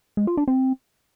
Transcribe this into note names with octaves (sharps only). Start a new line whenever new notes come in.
G#3
F4
D4
C4